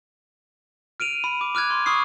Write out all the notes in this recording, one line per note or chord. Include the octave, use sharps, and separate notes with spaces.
F6 D7 D#7 F7
B5
D6
D6 F6 F#6 G#6
C6
B5 C#6 D#6 F6 C7